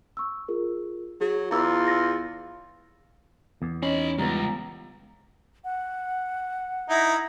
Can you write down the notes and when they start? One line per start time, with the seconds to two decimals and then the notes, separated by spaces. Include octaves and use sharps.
0.17 C#6 E6
0.48 F4 G#4 A#4
1.21 F#3 G#4
1.51 E2 F4 A#5 D6 E6
1.87 E6 A6 A#6
3.62 E2
3.83 C#4 D#4 D#5 B5
4.18 C#2 G3 B3 A#5
5.64 F#5
6.89 D#4 E4